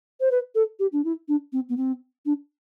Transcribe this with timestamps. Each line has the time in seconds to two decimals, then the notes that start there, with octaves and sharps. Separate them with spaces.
0.20 C5
0.31 B4
0.55 A4
0.79 G4
0.92 D4
1.05 E4
1.28 D4
1.53 C4
1.69 B3
1.77 C4
2.26 D4